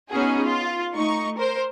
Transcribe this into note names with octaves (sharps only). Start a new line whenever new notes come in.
B3 C#4 D#4 F#4 G#4
F4
A3 D#4 C#6
A#4 C5